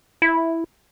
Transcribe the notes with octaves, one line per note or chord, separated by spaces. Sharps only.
E4